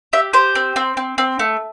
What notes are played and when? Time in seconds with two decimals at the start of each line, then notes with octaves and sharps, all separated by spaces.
0.13 G4 E5
0.33 G4 C5
0.55 C4
0.76 C4
0.97 C4
1.18 C4
1.39 A3